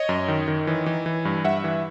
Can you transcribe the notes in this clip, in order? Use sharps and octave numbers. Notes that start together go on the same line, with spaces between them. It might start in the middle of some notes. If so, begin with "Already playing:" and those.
Already playing: C#5 D#5
F#2
D#3
D#3
E3
E3
E3
G2
G2 E5 F#5
E3